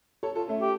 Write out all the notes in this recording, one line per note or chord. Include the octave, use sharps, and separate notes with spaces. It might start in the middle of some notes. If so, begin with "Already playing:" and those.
A4 C#5
F4 A4
A3 C#4
G4